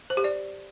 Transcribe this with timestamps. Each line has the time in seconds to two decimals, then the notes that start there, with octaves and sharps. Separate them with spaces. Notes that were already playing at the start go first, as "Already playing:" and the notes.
0.10 C5
0.17 G4
0.24 D5